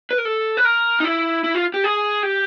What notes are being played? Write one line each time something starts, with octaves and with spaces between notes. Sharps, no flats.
B4
A#4
A4
B4
A#4
D#4
E4
E4
F4
G4
G#4
G4